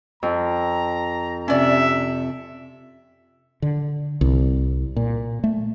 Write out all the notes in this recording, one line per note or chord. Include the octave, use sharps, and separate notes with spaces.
F2 A#5
C3 C#4 D5 E5
D3
C2
A#2
A3